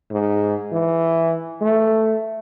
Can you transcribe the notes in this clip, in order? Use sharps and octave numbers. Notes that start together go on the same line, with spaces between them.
G#2
E3
A3